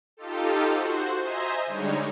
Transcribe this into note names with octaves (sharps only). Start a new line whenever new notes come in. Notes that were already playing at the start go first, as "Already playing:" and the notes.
D#4 F4 G4 A4
F#4 C5
C5 D#5 E5 G#5 A#5
D3 G3 G#3 D#4 C#5